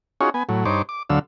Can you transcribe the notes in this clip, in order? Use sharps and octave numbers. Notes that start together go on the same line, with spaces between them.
C#4 D#4 F4 F#4 G#4 C#5
B3 G#5
A2 F#3
G2 D#4 C5 C#5 D6
D6
D2 D3 F#3 F5 E6